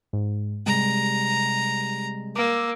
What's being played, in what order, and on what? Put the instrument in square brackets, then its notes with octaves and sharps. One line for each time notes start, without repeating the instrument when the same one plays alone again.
[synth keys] G#2
[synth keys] C3 G3 G#3 [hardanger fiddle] A#5
[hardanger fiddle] A#3 [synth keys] D6 E6